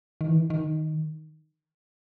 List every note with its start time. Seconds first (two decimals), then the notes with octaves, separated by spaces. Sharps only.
0.21 D#3
0.28 E3
0.35 D#3
0.50 D#3